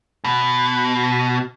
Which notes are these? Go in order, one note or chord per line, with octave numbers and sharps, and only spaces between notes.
B2